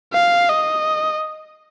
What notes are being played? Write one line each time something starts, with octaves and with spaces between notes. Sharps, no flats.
F5
D#5